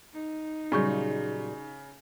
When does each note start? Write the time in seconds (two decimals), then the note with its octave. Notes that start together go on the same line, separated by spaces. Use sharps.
0.13 D#4
0.72 A#2 C#3 F#3 G3 G#4 C#6 G6